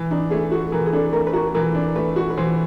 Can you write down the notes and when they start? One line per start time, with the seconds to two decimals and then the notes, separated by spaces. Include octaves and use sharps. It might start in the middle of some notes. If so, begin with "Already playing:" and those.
Already playing: E3
0.11 D4 D#4
0.30 A3 G#4
0.51 F#4 A4
0.72 E3 A#4
0.86 G#4
0.93 D4 A4
1.13 A3 A#4
1.27 B4
1.33 F#4 A#4
1.54 E3 A#4
1.75 D4
1.96 A3 B4
2.16 F#4
2.30 B4
2.37 E3 C5